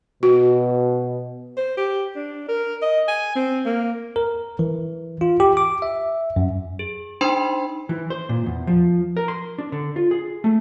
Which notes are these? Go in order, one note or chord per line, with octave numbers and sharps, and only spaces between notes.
B2 F#4
C5
G4
D4
A#4
D#5
G#5
C4
A#3
A#4
E3
F4
G4
D6
E5
F#2
G#4
D4 D#4 C5 G5 B5 C6
E3
C5
A#2
E2
F3
A#4
C6
D4
D3
F4
G#4
A3